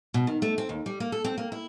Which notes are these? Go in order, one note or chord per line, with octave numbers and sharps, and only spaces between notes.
B2
D#3
A3
C4
D#2
G3
A#3
A4
C4
A#3
E4